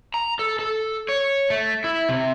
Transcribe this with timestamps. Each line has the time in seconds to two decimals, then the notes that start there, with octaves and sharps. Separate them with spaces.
0.14 A#5
0.39 A4
0.59 A4
1.08 C#5
1.50 A3
1.84 E4
2.09 C3